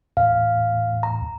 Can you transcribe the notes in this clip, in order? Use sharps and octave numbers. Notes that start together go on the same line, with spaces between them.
E2 A2 F5
A#5